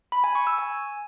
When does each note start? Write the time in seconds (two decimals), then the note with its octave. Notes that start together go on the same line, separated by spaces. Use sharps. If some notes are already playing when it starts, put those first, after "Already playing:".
0.12 B5
0.24 G#5
0.35 C#6
0.47 E6
0.58 G#5